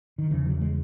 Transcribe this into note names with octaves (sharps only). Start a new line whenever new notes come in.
D#3
E2 C#3 E3
F#3
G#3